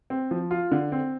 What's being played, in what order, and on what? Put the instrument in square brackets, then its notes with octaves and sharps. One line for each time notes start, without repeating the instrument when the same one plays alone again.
[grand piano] C4
F3
F4
D3
C4